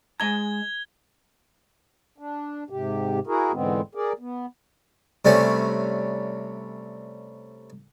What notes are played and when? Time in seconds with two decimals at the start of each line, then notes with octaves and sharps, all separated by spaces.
0.20 G#3 D#5 A#5 G#6 G7
2.18 D4
2.70 G#2 C3 G4
3.27 E4 F#4 G#4 A#4
3.52 E2 G#2 D3 G#3 B3 C4
3.95 G#4 A#4 D5
4.19 B3
5.25 C3 G3 A3 C4 C#4